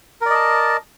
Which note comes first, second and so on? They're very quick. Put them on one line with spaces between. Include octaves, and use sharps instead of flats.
A#4 D5 D#5 A5